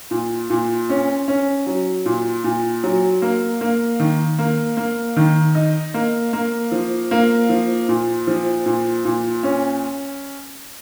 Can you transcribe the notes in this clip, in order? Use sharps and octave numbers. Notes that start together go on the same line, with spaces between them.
A#2
A#2
C#4
C#4
F#3
A#2
A#2
F#3
A#3
A#3
D#3
A#3
A#3
D#3
D#4
A#3
A#3
F3
A#3
F3
A#2
F3
A#2
A#2
C#4